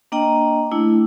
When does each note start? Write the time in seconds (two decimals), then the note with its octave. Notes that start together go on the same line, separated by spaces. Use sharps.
0.12 A#3 D4 D#5 G5 A#5
0.72 A3 D4 E4